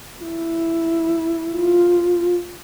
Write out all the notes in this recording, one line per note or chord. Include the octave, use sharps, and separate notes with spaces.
E4
F4